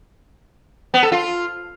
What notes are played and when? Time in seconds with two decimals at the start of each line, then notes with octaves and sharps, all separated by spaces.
0.94 B3
1.03 A4
1.12 F4